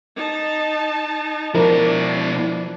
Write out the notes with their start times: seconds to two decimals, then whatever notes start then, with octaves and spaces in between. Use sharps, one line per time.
0.16 D#4 A5
1.55 B2 F3 D4 E4 A#4